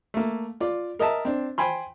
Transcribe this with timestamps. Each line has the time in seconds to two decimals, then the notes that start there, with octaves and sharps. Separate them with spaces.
0.14 A3 A#3
0.60 F4 D5
0.99 A#4 D#5 E5 A5
1.25 C4 D4
1.58 C5 G5 G#5 B5 C6